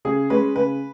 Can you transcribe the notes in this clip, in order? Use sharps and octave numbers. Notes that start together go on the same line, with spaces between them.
C#3 G#4
G#3 C#4 B4
C#3 B4